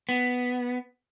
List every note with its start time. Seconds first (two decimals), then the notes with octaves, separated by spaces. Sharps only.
0.09 B3